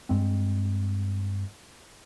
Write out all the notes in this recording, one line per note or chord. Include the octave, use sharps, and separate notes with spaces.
G2 G#3 C4